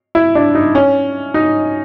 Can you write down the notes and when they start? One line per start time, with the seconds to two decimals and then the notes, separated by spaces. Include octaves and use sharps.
0.15 E4
0.35 D4
0.55 D#4
0.75 C#4
1.34 D#4